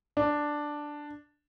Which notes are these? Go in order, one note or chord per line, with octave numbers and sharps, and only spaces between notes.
D4